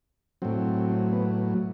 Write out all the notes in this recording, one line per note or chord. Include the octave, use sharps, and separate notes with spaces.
A2 F#3 C4
B3